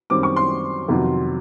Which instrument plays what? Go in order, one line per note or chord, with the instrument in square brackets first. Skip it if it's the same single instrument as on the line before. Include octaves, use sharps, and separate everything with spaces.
[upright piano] F#2 D#3 G3 C4 D6
C#6
C6
F2 C3 D#3 F#3 B3